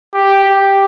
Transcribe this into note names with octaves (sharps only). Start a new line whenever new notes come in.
G4
G4